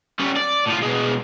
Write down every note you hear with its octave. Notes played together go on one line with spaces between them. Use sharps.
G3 C#4
D5
A2 F4
B2 G#3